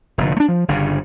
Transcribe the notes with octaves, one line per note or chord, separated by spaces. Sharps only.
F1 A#2 D3
A3 D4
F3
G1 G2 C#3